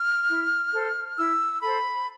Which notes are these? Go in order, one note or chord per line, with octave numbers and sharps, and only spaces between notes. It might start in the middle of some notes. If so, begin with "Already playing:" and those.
Already playing: F6
E4
A4 C5
E4 E6
A4 C5 B5